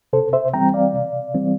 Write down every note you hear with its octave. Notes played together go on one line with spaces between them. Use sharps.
C3 A4 C5
C5 E5
E3 G3 C4 G5 A#5
D5 F5
C3
E3 G3 C4